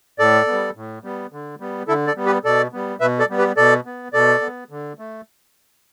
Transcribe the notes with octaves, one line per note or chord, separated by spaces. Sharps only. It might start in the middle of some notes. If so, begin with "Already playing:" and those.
A2 A4 D5
B3
G3
A2
G3 B3
D3
G3 B3
D3 E4 A4
A4 D5
G3 B3
G4 B4
B2 A4 D5
G3 B3
B2 B4 E5
A4 D5
G3 B3
G4 B4
B2 A4 D5
B3
B2 A4 D5
B3
D3
A3